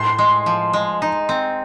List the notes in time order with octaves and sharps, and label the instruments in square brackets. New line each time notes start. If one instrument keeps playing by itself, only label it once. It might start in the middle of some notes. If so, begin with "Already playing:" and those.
Already playing: [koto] A2 [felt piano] C6
[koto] G#3
F3
G#3
D#4
C4